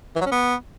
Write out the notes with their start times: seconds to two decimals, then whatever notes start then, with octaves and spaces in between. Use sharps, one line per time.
0.15 E3
0.21 F#3
0.26 C#4
0.31 B3